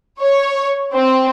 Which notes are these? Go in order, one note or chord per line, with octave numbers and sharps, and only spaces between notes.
C#5
C4